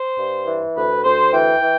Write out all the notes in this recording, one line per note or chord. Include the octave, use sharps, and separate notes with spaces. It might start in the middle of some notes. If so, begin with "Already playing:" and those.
Already playing: C5
G2
E3
D2 B4
D2 C5
E3 G5
E3